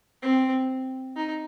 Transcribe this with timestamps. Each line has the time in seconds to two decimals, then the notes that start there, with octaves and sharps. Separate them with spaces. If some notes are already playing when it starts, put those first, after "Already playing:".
0.22 C4
1.17 D#4